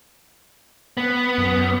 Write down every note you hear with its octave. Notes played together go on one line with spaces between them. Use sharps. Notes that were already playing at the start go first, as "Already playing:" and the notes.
B3
F#2